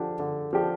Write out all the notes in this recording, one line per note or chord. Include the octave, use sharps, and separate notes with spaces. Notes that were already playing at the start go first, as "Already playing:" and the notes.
Already playing: D3 F3 D4 G4
D3
F3 D4 G4